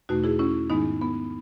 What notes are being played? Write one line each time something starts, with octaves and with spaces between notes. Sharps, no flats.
E2 B2 A3 D#4 F#4
E4 G#4
C#4 E4
G#2 D#3 G#3 B3 D#4
B3